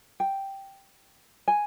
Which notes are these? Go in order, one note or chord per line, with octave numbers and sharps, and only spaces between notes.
G5
G#5